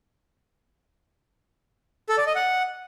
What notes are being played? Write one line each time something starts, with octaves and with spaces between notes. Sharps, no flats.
A4
D5
D#5
F#5